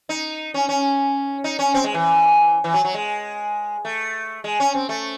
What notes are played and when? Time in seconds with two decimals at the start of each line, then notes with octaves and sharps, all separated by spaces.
0.09 D#4
0.54 C#4
0.69 C#4
1.44 D#4
1.59 C#4
1.74 C4
1.84 G#3
1.94 E3
2.64 E3
2.74 F#3
2.85 F#3
2.94 G#3
3.85 A3
4.44 G#3
4.60 C#4
4.75 C4
4.89 A3